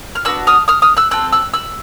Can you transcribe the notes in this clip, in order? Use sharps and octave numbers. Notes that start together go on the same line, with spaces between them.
F6
B3 D4 F#4 E6 F#6
D#6 F6
D#6 F6
D#6 F6
E6 F#6
C4 F4 A4 E6 F#6
E6 F#6
E6 F#6